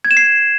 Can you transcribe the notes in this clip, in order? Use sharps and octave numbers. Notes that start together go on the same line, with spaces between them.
G#6
E7
C7